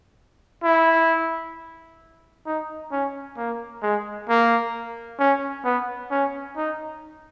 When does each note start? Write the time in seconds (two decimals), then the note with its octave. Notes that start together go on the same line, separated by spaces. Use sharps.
0.63 E4
2.46 D#4
2.92 C#4
3.37 A#3
3.82 G#3
4.29 A#3
5.19 C#4
5.64 B3
6.11 C#4
6.57 D#4